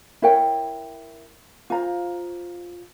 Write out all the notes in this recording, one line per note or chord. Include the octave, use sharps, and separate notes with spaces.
E4 A#4 C#5 G5
F4 C5 F5 A#5